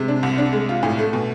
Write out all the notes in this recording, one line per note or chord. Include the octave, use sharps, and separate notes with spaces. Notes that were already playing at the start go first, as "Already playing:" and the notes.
Already playing: C3 G#3
D4
C2
D4
G#3
F4
A2
A3
B2